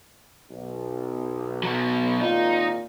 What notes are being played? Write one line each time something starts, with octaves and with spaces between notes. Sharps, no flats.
B1
B2 F#3
G#1 A#2 D#4 F4